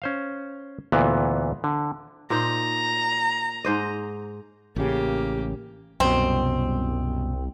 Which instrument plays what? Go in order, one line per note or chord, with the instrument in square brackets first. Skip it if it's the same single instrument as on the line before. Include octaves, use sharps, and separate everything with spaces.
[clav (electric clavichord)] C#4 C5 F5
D2 A#2 E3 B3
D3
[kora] A#2 D#4 C5 [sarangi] A#5
[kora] G#2 C5 D#5
[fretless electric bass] A1 C#3 [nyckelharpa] A#3 G4
[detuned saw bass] C2 [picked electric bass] F#2 B2 [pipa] C4